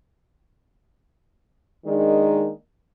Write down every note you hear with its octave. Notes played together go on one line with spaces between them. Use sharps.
D#3 G#3 A#3 D4 D#4